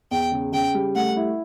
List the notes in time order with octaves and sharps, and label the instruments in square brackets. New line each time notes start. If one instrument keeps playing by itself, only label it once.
[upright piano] E2 [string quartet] G5
[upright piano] C#3
[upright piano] C#3 [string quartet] G5
[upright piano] G3
[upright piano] A3 [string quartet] F#5
[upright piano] E4